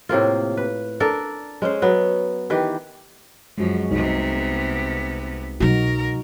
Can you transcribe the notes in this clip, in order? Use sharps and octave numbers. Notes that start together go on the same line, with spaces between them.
A2 C3 A#3 F4
B4
D4 A4 A#4 D5
G#3 C#4 C5
F#3 B3
D#3 E3 G4 B4
F#2 F3 G#3 F#4
C2 C3 B3 D#4
B2 F#3 D#4 F#4 A#4